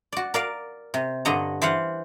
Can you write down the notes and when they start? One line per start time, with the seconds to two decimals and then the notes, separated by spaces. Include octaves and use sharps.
0.12 F#4 D5
0.34 A#4 D5 F5
0.94 C3
1.25 G2 D3 D#5 F#5 A#5
1.62 E3 C5 F5 F#5